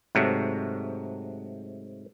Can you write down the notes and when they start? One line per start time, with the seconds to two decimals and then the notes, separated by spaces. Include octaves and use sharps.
0.15 G#2 C3 F#3 A3